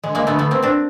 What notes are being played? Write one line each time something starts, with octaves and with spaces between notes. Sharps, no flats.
D3 G#3
G#3 A#3
A3 B3
A3 B3
A#3 C4
C4 D4